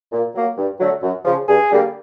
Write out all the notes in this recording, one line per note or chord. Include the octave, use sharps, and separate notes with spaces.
A#2
F#3 A#3
G2
D3 F#3 A3
F#2
C#3 F3
G2 G#4
D3 G3 A#3